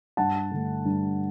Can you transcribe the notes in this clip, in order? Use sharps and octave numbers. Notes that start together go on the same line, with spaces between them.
G2 F#5 A5
D3 A3
G2